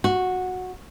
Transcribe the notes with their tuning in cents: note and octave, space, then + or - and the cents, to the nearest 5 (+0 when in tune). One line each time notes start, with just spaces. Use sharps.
F#4 -10